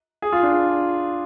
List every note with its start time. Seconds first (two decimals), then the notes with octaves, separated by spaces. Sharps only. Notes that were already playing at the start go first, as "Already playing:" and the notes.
0.22 G#4
0.32 F4
0.43 D4